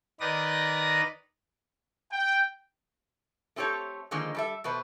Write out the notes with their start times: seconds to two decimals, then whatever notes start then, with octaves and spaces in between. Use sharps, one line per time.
0.20 D#3 D#4 B4 D5 D#6 A#6
2.12 G5
3.56 A3 C4 G4 A4 C#5
4.11 D3 D#3 F3 G#3 A#3
4.35 G3 A4 E5
4.64 B2 A3 B4 C5